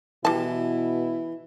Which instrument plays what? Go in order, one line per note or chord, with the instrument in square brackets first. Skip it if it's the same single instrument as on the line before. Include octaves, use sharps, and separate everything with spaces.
[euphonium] B2 [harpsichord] E3 [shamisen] G3 A5 [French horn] E4